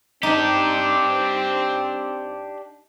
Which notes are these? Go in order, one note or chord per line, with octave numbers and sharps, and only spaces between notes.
C4 D4 D#4 G4